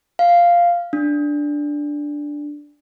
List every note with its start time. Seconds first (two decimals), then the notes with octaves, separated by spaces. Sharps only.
0.19 F5
0.93 D4